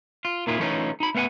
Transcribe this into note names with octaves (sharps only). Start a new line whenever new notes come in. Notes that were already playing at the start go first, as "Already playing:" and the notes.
F4
D#2 A#2 D#3 E4 F4
E3 A3 C#4 D#4 F4
D#4 B5
A3 B3 F5 F#5 G#5